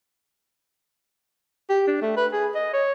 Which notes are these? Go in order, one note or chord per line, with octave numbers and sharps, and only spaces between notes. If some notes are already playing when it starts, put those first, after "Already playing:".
G4
D4
A3
B4
G#4
D#5
C#5